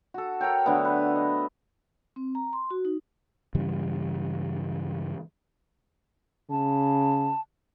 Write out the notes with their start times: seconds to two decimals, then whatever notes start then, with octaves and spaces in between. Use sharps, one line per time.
0.14 F#4 A4
0.41 A4 A#4 C#5 G5
0.66 D3 F#3 A3 B3
0.85 B4
1.16 D#5
2.16 C4
2.35 A#5
2.53 C6
2.71 F#4
2.85 D#4
3.55 G2 C#3 E3 G3
6.51 C#3 A5